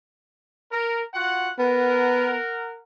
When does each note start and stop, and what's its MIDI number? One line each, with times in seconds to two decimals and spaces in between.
0.71 1.00 70
1.14 1.50 65
1.14 1.50 66
1.14 1.50 78
1.59 2.36 59
1.59 2.76 70
1.59 2.76 78